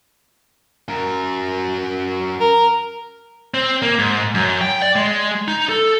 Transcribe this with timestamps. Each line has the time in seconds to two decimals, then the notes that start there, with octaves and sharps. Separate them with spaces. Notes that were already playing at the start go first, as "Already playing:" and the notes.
0.88 F#2 A#4
2.40 A#4
3.54 C4
3.82 A#3
3.99 G#2
4.34 F#2
4.61 G5
4.82 D5
4.96 G#3
5.48 D#4
5.69 A4